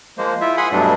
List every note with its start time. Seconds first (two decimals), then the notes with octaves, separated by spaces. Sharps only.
0.18 F3 G#3 A#3 C5
0.41 E4 F4 E5
0.57 G#4 F#5 G#5 B5 C6 D#6
0.72 G2 B2 F#3 G3 A3 D4